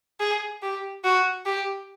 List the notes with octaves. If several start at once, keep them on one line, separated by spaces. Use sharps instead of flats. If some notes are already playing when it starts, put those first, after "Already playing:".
G#4
G4
F#4
G4